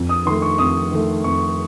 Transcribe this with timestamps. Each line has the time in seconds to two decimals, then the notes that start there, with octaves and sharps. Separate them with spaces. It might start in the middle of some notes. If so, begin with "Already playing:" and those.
Already playing: F2
0.09 D#6
0.26 D#3 C6
0.30 A3
0.42 C#6
0.58 F2 D#6
0.91 D#3 A3
1.24 F2 C#6